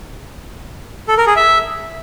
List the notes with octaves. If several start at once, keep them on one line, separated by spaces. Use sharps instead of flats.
A4
A#4
G#4
E5